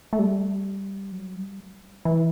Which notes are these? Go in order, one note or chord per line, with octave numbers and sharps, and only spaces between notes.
A3
G3
F#3
G3
E3